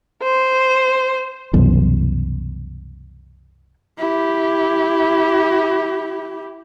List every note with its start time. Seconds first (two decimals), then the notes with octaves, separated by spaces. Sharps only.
0.23 C5
1.53 C2 F#2 B2 E3
3.99 E4 G4